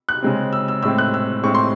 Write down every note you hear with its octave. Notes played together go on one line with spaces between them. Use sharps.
F#6
C#3 G#3 C4
E6
E6
A2 G#3 C4 E6
F#6
E6
A2 G#3 C4 C#6
C6